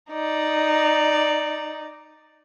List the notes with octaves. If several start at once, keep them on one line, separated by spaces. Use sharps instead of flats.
D#4 D5